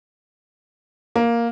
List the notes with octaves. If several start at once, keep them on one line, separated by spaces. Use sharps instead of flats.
A#3